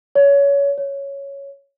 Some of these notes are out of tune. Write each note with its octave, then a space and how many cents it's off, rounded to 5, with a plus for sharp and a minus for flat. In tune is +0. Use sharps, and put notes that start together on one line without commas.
C#5 +25
C#5 +5